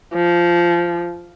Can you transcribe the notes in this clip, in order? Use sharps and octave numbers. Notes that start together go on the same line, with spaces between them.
F3